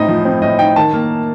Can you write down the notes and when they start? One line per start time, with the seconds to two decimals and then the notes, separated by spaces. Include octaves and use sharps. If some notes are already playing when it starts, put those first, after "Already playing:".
Already playing: A2 C4 D#4 D#5
0.08 F3
0.25 C4
0.42 A2 D#5
0.59 D#4 G5
0.76 D#3 A5
0.93 A#3